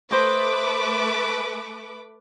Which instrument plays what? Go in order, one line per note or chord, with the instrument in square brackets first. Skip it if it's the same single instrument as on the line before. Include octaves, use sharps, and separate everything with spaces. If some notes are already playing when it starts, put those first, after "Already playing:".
[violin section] A3 B4 D6 [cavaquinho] C5 D#5